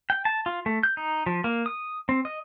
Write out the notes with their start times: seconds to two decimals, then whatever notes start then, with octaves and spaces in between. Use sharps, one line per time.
0.10 G5
0.25 A5
0.46 F4
0.66 A3
0.83 G6
0.97 D#4
1.26 F3
1.44 A#3
1.66 D#6
2.09 C4
2.25 D#5